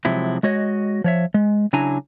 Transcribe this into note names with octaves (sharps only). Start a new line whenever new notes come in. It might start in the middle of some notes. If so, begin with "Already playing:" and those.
C3 F3 F#3 G#3 E4
G#3 F#4 C#5 D#5
F3 C#5 E5
G#3
C#3 F#3 D4 E4 G#5 A#5